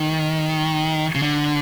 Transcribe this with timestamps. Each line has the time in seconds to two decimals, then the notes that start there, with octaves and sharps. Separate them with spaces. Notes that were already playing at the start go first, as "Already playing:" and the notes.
Already playing: D#3
1.15 C#3
1.22 D3